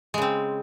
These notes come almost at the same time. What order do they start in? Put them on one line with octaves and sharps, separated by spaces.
G#3 C#3 C4